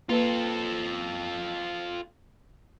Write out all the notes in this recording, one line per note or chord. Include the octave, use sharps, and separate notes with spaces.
A#3 F4 A4 B4